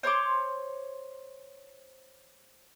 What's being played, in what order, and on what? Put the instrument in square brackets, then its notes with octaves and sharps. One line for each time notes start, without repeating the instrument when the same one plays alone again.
[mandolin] C5 C#5 C6 D6